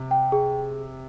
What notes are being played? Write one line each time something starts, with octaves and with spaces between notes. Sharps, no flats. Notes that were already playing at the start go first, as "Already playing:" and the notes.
Already playing: C3
G5
G#4